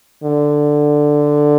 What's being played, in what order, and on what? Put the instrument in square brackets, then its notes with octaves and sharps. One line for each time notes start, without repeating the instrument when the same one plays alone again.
[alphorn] D3